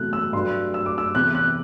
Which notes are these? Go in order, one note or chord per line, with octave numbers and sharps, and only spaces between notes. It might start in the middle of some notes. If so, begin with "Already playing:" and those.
Already playing: E2 C3 F#3 A3 F#6
E6
G2 F#3 A3 C6
E6
D6
E6
E2 C3 E3 F#6
F#6